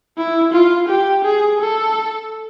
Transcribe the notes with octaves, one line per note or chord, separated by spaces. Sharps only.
E4
F4
G4
G#4
A4